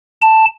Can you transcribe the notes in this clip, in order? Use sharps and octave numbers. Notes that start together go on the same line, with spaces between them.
A5